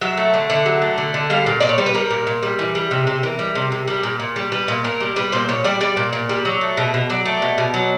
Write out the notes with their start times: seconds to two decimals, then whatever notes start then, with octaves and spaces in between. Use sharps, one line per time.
0.01 F#3 E5
0.17 A3
0.34 D3
0.50 D3
0.66 F#3
0.82 A3
0.98 D3
1.14 D3
1.30 G3 F5
1.46 A#2
1.60 A#2 D5
1.69 C#5
1.78 G3 C5
1.86 B4
1.94 G3 A#4
2.10 A#2
2.27 A#2
2.43 G3
2.59 E3
2.75 G3
2.91 C3
3.07 C3
3.23 E3 A#4
3.39 G3
3.55 C3
3.72 C3
3.88 G3
4.03 A#2
4.20 A#2
4.36 G3
4.52 G3 B4
4.68 A#2
4.84 A#2 A#4
5.00 G3
5.16 G3 B4
5.32 A#2 C5
5.49 A#2 C#5
5.64 G3 D5
5.81 G3 D5
5.97 A#2
6.13 A#2
6.29 G3
6.45 F#3
6.61 A3
6.77 B2
6.94 B2
7.10 F#3 D5
7.25 A3
7.42 B2
7.58 B2
7.74 F#3